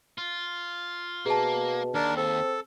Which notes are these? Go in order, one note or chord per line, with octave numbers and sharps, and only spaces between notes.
F4
B2 A#3 G#4 A5
D#2 D4 A#4
C4 A4